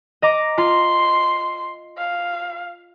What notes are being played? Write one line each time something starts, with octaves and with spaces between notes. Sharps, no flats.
D#5 A#5 D6
F4 C6
F5